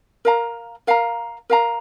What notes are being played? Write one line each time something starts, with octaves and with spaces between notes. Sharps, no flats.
A#4 F5 A#5
A#4 F5 A#5
A#4 F5 A#5